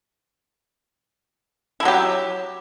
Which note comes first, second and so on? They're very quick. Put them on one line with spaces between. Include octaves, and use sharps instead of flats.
E4 F3 F#3 G4